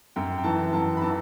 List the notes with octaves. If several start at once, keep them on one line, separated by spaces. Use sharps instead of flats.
F#2 G5
G5
E3 A5
F#2 A5
B5
E3 A5